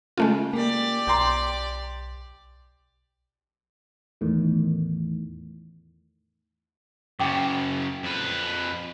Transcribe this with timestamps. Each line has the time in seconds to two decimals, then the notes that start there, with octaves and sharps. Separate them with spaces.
0.17 C#3 G#3 A3 F4
0.53 A#3 G4 D5
1.07 B1 G5 A#5 C6
4.21 E2 A2 D#3
7.20 F#2 C#3 E4 G5 D6
8.03 F2 B4